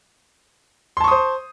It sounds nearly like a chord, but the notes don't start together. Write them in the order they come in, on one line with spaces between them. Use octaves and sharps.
C6 A5 C#6 D#6 C5